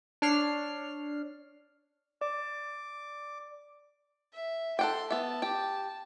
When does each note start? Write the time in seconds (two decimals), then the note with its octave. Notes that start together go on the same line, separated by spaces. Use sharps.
0.22 D4 C#5 F6 C7
2.21 D5 D6
4.33 E5
4.79 A4 F#5 G5 C6
5.10 B3 E5 A5
5.42 G4 G5